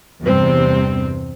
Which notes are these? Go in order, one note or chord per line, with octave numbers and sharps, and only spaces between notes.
E2 G2 C3 C4